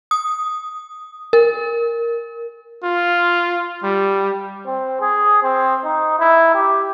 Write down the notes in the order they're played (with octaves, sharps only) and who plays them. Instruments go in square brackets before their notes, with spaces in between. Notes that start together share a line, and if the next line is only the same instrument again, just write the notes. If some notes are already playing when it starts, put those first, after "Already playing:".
[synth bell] D#6
A#4
[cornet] F4
G3
[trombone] C4
G#4
C4
D#4
E4
G4